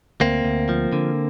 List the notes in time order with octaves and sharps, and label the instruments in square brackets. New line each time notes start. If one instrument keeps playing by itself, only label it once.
[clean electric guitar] D2 A#3 C4
D2
F3
D3